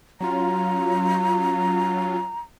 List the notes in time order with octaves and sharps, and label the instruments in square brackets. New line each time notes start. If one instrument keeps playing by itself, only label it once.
[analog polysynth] F#3 C#4 F4 [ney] A#5